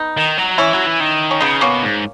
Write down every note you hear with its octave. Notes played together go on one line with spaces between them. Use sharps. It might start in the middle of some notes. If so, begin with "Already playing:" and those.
Already playing: B3 D#4
D#3
F#3
E3 C#4 E4
F#3
E3
D#3
C#4
C#3 B3 D#4
B2 A#3 C#4
G#2